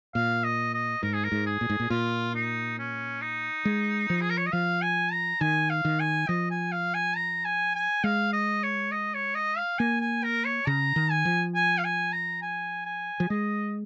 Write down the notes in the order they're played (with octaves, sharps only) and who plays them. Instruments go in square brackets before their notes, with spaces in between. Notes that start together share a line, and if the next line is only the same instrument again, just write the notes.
[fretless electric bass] A#2 [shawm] F5
[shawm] D#5
D#5
[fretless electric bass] G#2 [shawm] A#4
[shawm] G#4
A#4
[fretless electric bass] G#2
[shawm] G#4
[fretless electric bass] A#2
G#2
A#2
[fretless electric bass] A#2 [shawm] F4
[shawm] D#4
C#4
D#4
[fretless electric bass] G#3
F3
[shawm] G#4
A#4
C#5
D#5
[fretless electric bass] F3 [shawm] F5
[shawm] G#5
A#5
[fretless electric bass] D#3 [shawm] G#5
[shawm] F5
[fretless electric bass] D#3
[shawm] G#5
[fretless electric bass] F3 [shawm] D#5
[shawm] G#5
F5
G#5
A#5
G#5
G#5
[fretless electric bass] G#3 [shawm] F5
[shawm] D#5
C#5
D#5
C#5
D#5
F5
[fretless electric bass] A#3 [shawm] G#5
[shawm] G#5
A#4
C#5
[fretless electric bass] C#3 [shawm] A#5
[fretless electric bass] D#3
[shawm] G#5
[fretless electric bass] F3
[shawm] G#5
F5
G#5
A#5
G#5
G#5
[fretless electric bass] F3
[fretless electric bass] G#3 [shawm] D#5